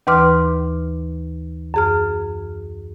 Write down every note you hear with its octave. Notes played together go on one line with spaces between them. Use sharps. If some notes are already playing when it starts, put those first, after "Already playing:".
D#2 E3 B4 C6 D6 F6
F#2 G#4 F6